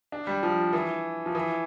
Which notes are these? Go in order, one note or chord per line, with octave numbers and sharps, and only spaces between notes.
D4
G3
F3
E3
F3
E3